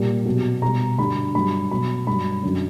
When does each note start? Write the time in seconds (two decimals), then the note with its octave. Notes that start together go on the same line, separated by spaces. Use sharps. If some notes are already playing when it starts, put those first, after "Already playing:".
Already playing: A#2 G3
0.26 B2 F#3
0.62 B2 G3 A#5
0.98 G2 D3 G3 B5
1.35 G2 F#3 B5
1.70 B2 F#3 B5
2.07 G2 F#3 B5
2.43 F#2 D3 F#3